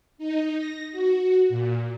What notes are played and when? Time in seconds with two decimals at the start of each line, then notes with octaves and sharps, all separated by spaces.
0.18 D#4
0.54 A#6
0.92 F#4
1.49 A#2